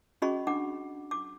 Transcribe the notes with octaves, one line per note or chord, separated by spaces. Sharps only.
C#4 F#4 G#4 D#5 B5 C#6
D4 F#5 D6
D6